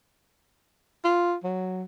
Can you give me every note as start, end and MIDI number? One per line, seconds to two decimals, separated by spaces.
1.04 1.35 65
1.44 1.83 54